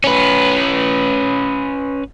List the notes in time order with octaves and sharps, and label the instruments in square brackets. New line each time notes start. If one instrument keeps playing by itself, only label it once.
[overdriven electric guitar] C#4 B4